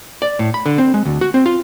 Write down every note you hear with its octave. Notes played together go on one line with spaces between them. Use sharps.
D5
A2
B5
D3
C4
G#3
D2
F#4
C4
F4